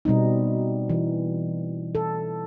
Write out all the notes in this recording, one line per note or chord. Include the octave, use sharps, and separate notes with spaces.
B2 G3 C4 D#4
E3
A4